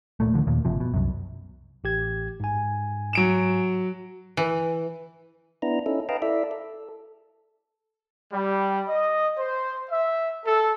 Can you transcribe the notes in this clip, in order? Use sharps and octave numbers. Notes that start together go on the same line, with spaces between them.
D#1 G#1 A#2 A3
D#2 B2 D3 F3
D#2 A#2
F#1 C3 F3
B2
C2 F#2
A1 G4 G#6
G#2 G#5
F#3 D7 E7
E3
B3 D4 E4 A#5
C#4 D#4 E4 A4
B4 D#5 F5 G5 A5 A#5
E4 A4 D5 E5
A4
G3
D#5
C5
E5
A4